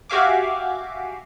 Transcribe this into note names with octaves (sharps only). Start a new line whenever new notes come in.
F#4 G4 E5 F5 G#5 D6